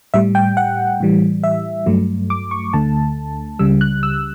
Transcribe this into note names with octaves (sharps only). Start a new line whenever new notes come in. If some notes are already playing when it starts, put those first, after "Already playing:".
A2 G3 E5
G5
F#5
A2 E3 G3
E5
G2 F#3 A3
D6
C#6
D2 D3 A3 A5
C#2 C#3 G3 E6
F#6
E6